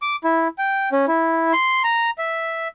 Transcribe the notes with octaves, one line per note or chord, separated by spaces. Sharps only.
D6
E4
G5
C#4
E4
C6
A#5
E5